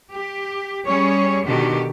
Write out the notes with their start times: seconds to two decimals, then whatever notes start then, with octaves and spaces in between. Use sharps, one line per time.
0.12 G4
0.86 G3 C#4 G#4 C#5
1.45 B2 D3 D#3 F#4 G4